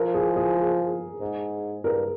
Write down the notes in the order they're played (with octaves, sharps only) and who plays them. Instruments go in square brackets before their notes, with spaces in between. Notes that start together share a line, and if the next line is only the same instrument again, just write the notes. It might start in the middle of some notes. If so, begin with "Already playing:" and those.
Already playing: [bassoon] F3 [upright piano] A#4
[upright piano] G#4
G#4
[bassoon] G#2
[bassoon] G2 [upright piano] A#4